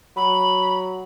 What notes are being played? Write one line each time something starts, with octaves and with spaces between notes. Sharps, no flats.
F#3 B5